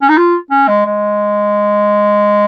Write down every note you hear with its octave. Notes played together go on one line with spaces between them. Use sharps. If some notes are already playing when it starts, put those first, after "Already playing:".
C#4
D#4
F4
C#4
G#3
G#3